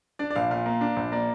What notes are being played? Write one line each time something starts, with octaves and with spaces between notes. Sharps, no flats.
D4 D5
D5
A#1 F5
A#2 F5
A#3
D4
A#1
A#3 D5